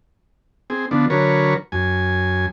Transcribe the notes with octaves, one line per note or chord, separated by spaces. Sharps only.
C4 G#4
D3 F3 B3 D4
D3 F#3 A#4 B4 C#5
F#2 G#5